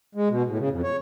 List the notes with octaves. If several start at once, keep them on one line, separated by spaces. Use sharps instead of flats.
G#3
B2
A2
C#3
F2
C#5